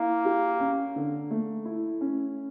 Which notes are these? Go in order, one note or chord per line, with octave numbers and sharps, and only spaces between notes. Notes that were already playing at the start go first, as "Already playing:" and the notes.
Already playing: A#3 E4
G4
C#4
D3
A3
E4
C#4